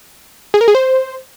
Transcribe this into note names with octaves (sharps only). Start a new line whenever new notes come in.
G#4
A#4
G#4
C5